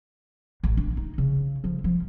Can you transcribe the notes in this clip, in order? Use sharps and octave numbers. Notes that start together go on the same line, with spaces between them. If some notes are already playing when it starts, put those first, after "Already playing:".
A1
D4
D#4
C#3
F3
F3